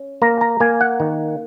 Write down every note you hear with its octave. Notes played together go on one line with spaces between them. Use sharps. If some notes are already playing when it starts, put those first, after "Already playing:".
Already playing: C#4
A#3 A#5
A#5
A#3 G#5
F#5
D#3